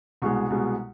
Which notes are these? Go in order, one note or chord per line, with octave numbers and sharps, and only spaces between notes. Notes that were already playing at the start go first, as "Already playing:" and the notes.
C2 B2 G#3 C#6
C2 B2 G#3